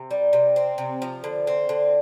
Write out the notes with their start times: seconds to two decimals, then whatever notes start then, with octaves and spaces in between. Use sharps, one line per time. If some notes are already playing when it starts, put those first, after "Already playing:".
Already playing: C3
0.11 G3
0.33 C3
0.56 C4
0.78 C3
1.02 F3
1.24 D3
1.47 C4
1.69 D3